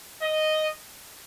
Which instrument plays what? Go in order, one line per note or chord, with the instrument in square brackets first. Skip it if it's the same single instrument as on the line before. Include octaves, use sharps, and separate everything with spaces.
[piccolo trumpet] D#5